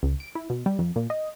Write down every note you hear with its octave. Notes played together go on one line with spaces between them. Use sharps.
C#2
D7
E4
B2
G3
F2
A#2
D#5